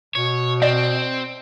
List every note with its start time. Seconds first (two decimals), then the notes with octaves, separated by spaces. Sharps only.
0.15 B2 C#5
0.62 C4 D5 D#5